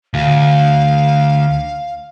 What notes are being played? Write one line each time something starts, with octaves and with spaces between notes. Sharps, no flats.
D2 F5